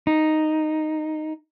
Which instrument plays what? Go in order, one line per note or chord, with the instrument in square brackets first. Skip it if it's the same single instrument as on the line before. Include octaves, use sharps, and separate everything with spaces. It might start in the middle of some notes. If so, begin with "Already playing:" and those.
[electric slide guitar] D#4